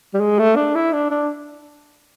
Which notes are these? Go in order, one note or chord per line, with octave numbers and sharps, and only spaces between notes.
G3
G#3
A3
D4
E4
D4
D4